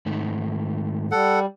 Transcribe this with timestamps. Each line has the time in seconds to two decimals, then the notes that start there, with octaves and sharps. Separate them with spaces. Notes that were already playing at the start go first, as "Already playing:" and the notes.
0.06 G#2 D#3 A3
1.11 G3 A4 F#5